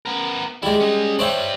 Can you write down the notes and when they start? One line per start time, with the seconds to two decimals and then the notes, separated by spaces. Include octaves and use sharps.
0.06 B3 A#4
0.63 G3 G#3 E4 D5
0.81 C#4 D#5
1.19 D4 G4 C5 C#5 E5